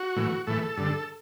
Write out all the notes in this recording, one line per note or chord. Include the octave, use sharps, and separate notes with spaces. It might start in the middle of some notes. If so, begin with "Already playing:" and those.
Already playing: F#4
A2 E3
A2 E3 A4
A4
G2 D3